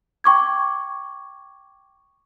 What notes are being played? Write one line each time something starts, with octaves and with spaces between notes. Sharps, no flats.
G5 C#6 D6 G#6